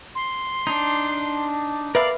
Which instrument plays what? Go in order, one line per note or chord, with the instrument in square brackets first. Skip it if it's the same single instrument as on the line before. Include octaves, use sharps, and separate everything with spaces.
[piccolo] C6
[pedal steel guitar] D4 D#4
[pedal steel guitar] A#4 D5 F5 [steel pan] B4 E5